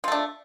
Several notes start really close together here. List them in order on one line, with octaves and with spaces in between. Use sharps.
F4 A3 D4